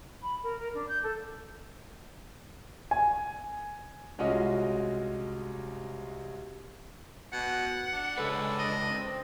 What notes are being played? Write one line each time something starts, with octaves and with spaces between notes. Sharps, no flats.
B5
A#4
A#4
D4
G6
A4
G#5
C2 G#3 C#4 F4 F#4 D#5
B2 F#5
D4
C#2 G#3 C#4 A4 B4
D#5
C4